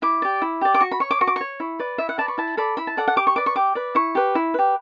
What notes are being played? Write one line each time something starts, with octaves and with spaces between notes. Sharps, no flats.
E4 D6
G4 D5
E4
G4 D5
D6
F#4 C#6
B5
C#5 C#6
D6
F#4 C#6
D6
C#5 C#6
E4
B4 D5
E4 E5
F#5
B4 D5 A5
C#6
E4 A5
A4 D5 B5
E4 B5
A5
A4 D5 F#5
F#5
G4 D6
C#6
B4 D5 D6
C#6
G4 D6
B4 D5
E4 C#6
G4 B4
E4
G4 B4